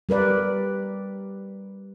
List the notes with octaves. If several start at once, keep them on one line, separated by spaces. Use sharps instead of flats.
G3 A#4 B4 D5